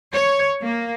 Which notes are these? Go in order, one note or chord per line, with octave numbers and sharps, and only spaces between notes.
C#5
A#3